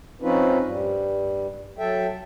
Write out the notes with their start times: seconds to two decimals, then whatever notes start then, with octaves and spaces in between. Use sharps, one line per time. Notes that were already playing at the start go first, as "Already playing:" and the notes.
0.22 F3 C4 C#4 D#4 F4 B4
0.64 G2 G3
1.78 F#3 A4 E5 G5